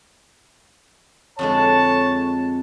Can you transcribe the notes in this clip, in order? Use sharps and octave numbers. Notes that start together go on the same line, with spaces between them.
F2 D3 G#3 C#5 A5